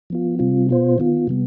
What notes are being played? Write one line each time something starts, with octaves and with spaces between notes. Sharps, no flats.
F3 B3 F4
C3 G3 C4 F4
B2 B3 F4 C5
D#3 B3 F4
C3 G3 B3